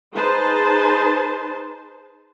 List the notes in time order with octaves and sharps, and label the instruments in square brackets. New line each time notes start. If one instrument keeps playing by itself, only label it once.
[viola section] D#4 G#4 B4 C5 A5